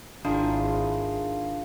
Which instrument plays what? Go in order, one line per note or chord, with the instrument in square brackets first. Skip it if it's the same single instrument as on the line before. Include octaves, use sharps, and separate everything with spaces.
[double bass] G#1 [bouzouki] D#3 E4 G#4 [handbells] D4 [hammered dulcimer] F4